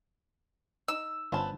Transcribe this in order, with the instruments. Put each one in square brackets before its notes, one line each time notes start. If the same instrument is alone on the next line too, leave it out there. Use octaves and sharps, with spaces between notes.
[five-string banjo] D#4 [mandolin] E6
[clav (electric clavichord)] G1 C#4 F4 [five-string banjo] B3 C5 A5